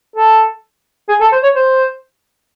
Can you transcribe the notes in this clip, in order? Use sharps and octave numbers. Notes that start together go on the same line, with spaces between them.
A4
G#4
A4
C5
C#5
C5